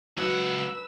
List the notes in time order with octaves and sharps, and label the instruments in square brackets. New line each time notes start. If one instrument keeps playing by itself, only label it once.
[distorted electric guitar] C#2 F#5 [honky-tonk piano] F#3 [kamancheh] B4 E6